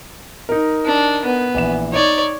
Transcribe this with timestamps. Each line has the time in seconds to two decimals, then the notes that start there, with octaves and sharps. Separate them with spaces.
0.49 D#4 A#4
0.86 D4
1.25 B3
1.54 A#1 E3 E7
1.93 D#4 C#5 D5